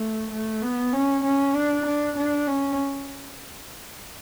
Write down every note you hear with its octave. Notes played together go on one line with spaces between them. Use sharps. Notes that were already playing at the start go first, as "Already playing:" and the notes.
Already playing: A3
A3
B3
C#4
C#4
D4
D4
D4
C#4